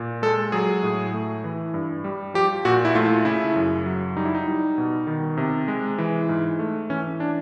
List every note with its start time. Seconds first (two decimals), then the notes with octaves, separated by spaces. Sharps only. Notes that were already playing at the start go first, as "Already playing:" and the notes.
Already playing: A#2
0.22 G#3 A4
0.52 F#3 G#4
0.83 A2
1.14 A3
1.44 E3
1.74 G2
2.04 G3
2.34 F3 G4
2.65 A#2 F#4
2.85 E4
2.95 A3 F4
3.25 C#3 E4
3.56 F#2
3.86 F#3
4.16 G3 D#4
4.25 E4
4.35 D#4
4.47 G3
4.78 B2
5.07 D#3
5.37 C3
5.68 G#3
5.98 E3
6.29 G#2
6.59 A3
6.90 E3 C#4
7.20 D4